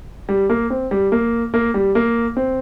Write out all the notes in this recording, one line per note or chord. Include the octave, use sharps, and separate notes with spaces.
G3
A#3
C4
G3
A#3
A#3
G3
A#3
C4